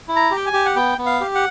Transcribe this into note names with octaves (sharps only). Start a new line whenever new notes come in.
E4
A#5
G4
G5
G#5
G4
F#5
B3 G5
B3
F5
G4
F#5